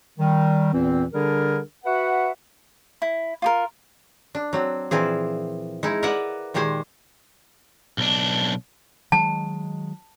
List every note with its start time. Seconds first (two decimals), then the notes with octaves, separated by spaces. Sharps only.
0.19 D#3 G3
0.73 E2 A#2 E3 C4
1.13 D3 G3 D4 G#4 A#4
1.84 F#4 B4 E5 F#5
3.02 E4
3.42 F4 G4 A#4
4.35 D4
4.53 F#3 C4
4.91 A#2 E3 F3 C4 G#4
5.83 G#3 D#4 E4
6.03 A#4 B4 D5 E5 F#5
6.54 A#2 D#3 G#3 G4 C5 G#5
7.98 B1 D4
9.12 D#3 F#3 G#3 A5